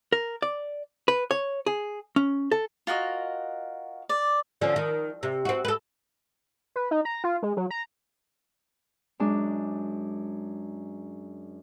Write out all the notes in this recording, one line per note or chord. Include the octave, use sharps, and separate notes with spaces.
A#4
D5
B4
C#5
G#4
C#4
A4
F4 F#4 A#4 D#5
D5
D3 F3 C#4
D#3
C3
C4 F#4
A4 B4
B4
D#4
A#5
F4
G#3
F#3
A#5
F#2 G#3 D4